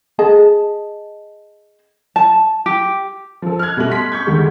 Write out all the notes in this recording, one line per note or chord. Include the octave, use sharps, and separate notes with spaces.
G#4 D#5 A5
A5
G4
F3 A4
F6 F#6 G#6
B2 G3 A3 F#7
C6 B6
C#6 G6 G#6
D2 D#3 G3 G#3